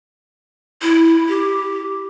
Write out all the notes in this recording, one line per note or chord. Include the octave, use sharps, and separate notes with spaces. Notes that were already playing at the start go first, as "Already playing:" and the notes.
E4
G4